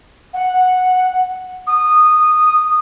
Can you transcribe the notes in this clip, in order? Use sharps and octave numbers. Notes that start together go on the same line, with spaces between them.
F#5
D#6